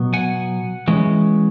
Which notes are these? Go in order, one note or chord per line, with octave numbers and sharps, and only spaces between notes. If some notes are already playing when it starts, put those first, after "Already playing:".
Already playing: B2 F#3 B3
F#5 G#5
E3 G#3 C#4